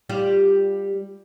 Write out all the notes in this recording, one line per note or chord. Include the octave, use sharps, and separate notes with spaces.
G3 F4 G4